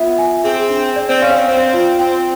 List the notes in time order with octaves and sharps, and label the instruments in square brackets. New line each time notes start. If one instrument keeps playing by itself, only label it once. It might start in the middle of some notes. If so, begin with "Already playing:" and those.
Already playing: [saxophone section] B3 [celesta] F4 E5
[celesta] G#5
[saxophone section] C4 [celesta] G#4
[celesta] D4
D5
[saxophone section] C4
[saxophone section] C#4 [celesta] F5
[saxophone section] C4
[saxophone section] C4 [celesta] C5
[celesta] F4
[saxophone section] C4 [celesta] G5